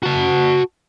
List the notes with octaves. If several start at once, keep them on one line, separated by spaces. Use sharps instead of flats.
F#4 A5